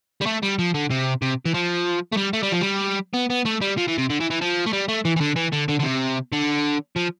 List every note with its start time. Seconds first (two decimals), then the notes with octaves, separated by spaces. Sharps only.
0.22 G3
0.26 A3
0.43 G3
0.59 F3
0.74 D3
0.90 C3
1.22 C3
1.46 E3
1.54 F3
2.13 A3
2.17 G3
2.33 A3
2.43 G3
2.52 F3
2.61 G3
3.14 B3
3.30 B3
3.45 A3
3.61 G3
3.77 F3
3.88 E3
3.98 C3
4.10 D3
4.20 E3
4.30 E3
4.41 F3
4.66 A3
4.73 G3
4.88 A3
5.05 E3
5.16 E3
5.21 D3
5.36 E3
5.52 D3
5.68 D3
5.79 D3
5.84 C3
6.32 D3
6.96 F3